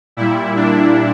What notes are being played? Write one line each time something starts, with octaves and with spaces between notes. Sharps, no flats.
A#2 G3 E4
D4